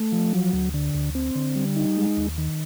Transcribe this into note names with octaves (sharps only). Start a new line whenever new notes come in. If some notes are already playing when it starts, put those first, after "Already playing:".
Already playing: A3
F3
F#3
D2
D3
D2
C4
D3
G3
D#4
G#3
D#2
D#3